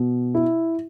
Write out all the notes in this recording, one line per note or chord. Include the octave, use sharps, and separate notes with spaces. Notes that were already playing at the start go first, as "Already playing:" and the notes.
Already playing: B2
E4